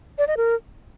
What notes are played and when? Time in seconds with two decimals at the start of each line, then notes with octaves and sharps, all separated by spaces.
0.18 D5
0.28 D#5
0.37 A#4